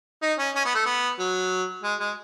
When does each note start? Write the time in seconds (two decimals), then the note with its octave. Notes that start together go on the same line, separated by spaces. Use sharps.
0.22 D#4
0.39 C#4
0.55 C#4
0.65 B3
0.75 A3
0.86 B3
1.19 F#3
1.83 G#3
1.99 G#3